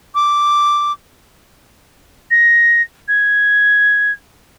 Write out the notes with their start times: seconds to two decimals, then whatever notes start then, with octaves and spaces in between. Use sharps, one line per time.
0.15 D6
2.31 A#6
3.08 G#6